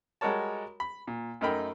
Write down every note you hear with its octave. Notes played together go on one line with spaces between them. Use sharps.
G3 G#3 F#4 A#4 C#5 A5
B5
A#2
F#2 A3 D#4 A#4 G5 B5